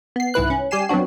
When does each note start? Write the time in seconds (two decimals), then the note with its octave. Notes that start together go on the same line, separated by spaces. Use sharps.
0.16 B3 C7
0.34 C2 G#2 E4 B4 F#6
0.50 C#4
0.71 G3 G4 G#5 C7 E7
0.89 F#3 B3 C4 D4 F#4